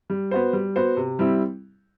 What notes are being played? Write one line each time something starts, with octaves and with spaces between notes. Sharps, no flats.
G3
B3 F#4 C5
G3
B3 F#4 C5
C3
G3 C4 E4